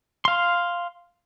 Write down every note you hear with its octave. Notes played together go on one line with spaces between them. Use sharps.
F5 C6